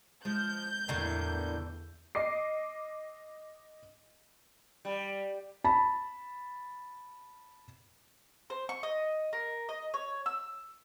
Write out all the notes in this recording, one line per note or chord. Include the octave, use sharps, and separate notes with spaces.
F3 G#3 G6
E2 A2 D3 A#3
D#5 D6 C7
G3
A5 B5
C5
C#6
D#5
A#4
D#5
C#5
E6